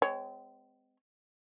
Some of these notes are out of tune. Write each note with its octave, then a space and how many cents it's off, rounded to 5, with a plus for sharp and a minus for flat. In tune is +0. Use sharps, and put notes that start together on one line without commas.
G#3 +0 C4 -35 C#5 +0